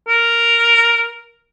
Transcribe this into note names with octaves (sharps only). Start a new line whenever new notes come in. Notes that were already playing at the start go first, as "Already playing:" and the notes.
A#4